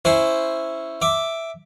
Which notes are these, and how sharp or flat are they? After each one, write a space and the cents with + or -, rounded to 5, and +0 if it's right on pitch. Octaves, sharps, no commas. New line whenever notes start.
C#4 +0 E4 +0 C5 +0
E5 +0 D6 +0